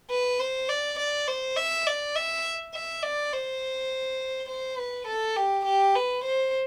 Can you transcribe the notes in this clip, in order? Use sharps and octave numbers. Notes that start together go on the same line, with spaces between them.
B4
C5
D5
D5
C5
E5
D5
E5
E5
D5
C5
C5
B4
A4
G4
G4
B4
C5